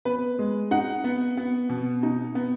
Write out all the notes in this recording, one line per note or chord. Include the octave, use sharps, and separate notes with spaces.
B3 B4
G#3
D#4 F#5
B3
B3
B2
D#4
B3